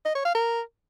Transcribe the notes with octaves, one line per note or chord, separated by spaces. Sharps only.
D#5
C#5
F5
A#4